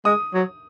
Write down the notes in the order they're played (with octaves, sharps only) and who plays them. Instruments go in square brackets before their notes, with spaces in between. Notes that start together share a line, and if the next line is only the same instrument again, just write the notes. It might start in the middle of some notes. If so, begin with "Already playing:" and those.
[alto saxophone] G#3 [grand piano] D#6
[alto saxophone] F#3